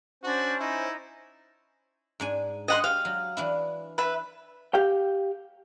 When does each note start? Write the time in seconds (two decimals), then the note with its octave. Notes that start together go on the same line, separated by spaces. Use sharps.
0.24 C#4 D4 F#4 C5
0.60 D#4 E4
2.20 G#2 D4 G#5
2.68 G4 G#4 D#5 F#5 C6
2.84 G4 F5
3.05 F#3
3.37 E3 D4 E4
3.98 B4 E5
4.74 G4 F5 G5